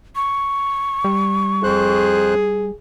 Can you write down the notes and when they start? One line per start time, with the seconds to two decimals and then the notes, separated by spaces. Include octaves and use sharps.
0.16 C#6
1.04 G3
1.64 F2 G#4 C5 F#6